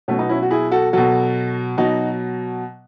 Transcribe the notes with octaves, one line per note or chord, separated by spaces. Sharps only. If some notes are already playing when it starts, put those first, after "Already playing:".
B2 F#3 A3 C#4
B3 D#4
C#4 E4
F#4
E4 G#4
F#4 A4
B2 F#3 F#4 A4
B2 F#3 D#4 F#4